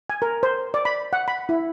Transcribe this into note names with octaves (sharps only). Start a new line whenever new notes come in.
G#5
A#4
C5
D5
B5
F#5
B5
E4